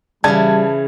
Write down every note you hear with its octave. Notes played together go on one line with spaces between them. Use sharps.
C#3 E3 G3 D5 A5 G#6